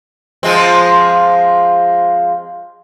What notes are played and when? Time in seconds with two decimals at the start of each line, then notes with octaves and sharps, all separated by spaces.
0.43 F3 G#3 C4